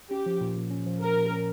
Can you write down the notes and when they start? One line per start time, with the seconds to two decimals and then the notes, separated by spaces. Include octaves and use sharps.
0.11 C#4 G4
0.26 F3
0.41 A#2
0.56 A#2
0.71 C#4
0.86 F3
1.01 A#2 A#4
1.16 A#2
1.31 C#4